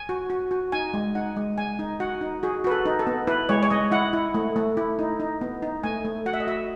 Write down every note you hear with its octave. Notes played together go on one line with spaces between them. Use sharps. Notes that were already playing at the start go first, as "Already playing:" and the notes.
Already playing: G#5
F#4
F#4
F#4
D#4 G#5
G#3
D#4 F#5
G#3
G#3 G#5
D#4
F#4 F#5
D#4
F#4 G#4
F#4 B4
A4
D#4
A4
B3
E4 B4
G#3 C#5
C#5
G#3 D#5
E4 F#5
E4
A3
A3
E4
D#4
D#4
B3
D#4
A3 G#5
A3
F#4 F#5
E5
D#5
F#4 E5